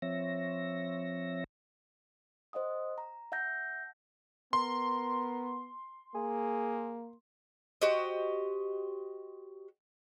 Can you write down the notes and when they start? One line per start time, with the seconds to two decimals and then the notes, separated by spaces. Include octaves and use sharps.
0.02 F3 C4 C#5 E5 A#6
2.53 C5 D#5 F#5 D#6
2.98 A#5
3.32 E5 F#5 A5 G6 A#6
4.53 B3 A#4 C6
6.15 A#3 G#4
7.81 F#4 G4 C5 D#5